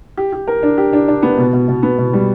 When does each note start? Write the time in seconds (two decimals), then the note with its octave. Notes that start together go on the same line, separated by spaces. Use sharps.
0.17 G4
0.33 G4
0.48 A#4
0.63 D4
0.78 G4
0.93 D4
1.08 D4
1.23 B3
1.38 B2
1.53 B2
1.68 B2
1.83 B3
1.98 B2
2.13 G3